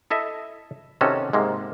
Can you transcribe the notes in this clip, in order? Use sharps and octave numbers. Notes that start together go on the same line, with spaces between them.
E4 A4 D#5 E5
C3 D#3 C#4 F#4 A4
G#2 C3 G#3 A#3